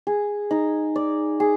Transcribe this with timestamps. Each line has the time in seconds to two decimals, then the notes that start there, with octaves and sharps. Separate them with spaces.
0.07 G#4
0.51 D#4
0.96 D5
1.40 G#4